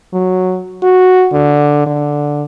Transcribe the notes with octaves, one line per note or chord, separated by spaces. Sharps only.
F#3
F#4
D3
D3